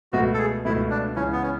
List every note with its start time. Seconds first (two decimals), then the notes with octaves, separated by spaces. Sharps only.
0.13 C#2 B2 A3 F#4
0.34 A4
0.38 G#4
0.65 C#2 B2 A3 E4
0.90 D4
1.16 C#2 C#3 E3 C#4
1.32 B3
1.43 C#4